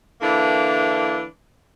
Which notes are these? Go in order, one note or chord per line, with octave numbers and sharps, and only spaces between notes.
D3 E3 A#3 D4 E4